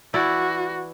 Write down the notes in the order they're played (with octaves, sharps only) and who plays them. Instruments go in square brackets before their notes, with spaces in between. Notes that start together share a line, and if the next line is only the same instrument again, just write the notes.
[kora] E3 E4 D5 [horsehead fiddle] F#4